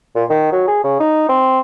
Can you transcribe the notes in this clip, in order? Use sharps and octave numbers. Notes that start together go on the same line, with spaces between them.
A#2
D#3
F#3
G#4
C#3
D#4
C4